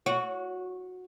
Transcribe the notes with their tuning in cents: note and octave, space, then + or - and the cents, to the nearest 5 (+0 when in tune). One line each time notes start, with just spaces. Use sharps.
F#4 -15 C#5 +15